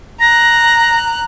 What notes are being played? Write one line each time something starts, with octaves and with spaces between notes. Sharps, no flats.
A#5 F#6 A#6